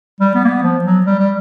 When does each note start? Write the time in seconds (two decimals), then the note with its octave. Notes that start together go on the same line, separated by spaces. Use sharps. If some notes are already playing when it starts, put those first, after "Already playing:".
0.20 G3
0.35 B3
0.45 A#3
0.48 B3
0.63 F3
0.85 F#3
1.06 G3
1.20 G3